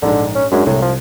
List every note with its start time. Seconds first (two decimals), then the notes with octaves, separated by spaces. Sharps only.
0.02 A#1 G#2 D3
0.35 C#4
0.52 F#2 G#3 D4
0.66 C2 A2
0.82 F3